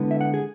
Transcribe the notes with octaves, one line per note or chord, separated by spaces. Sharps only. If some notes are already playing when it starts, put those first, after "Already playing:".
Already playing: D3 G#3 B3 E4
E5
F#5
G#4